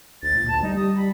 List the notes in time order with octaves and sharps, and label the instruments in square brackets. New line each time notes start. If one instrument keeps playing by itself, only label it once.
[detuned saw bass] D2 [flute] A6
[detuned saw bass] A#2
[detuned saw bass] D2 [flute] A5
[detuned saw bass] G3 [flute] D#4
[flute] D#6
B5